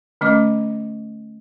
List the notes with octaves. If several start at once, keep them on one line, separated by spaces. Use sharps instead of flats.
D3 A3 C#4 D#5 D6